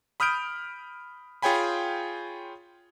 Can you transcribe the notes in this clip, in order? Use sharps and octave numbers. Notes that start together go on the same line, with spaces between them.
B5 D#6 F6 G6 D7
F4 G#4 C#5 G5 G#5 B5